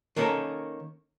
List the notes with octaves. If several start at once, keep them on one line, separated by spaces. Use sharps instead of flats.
D#3 A#3 B3 C#4 A4 A#4